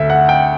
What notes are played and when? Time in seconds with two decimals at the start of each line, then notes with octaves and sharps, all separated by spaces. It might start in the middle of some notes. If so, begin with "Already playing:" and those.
Already playing: D2 D3 E5
0.10 F#5
0.29 G5